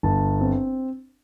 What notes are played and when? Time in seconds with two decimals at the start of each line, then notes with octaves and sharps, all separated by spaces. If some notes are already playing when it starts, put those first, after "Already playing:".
0.03 G1 A5
0.40 C4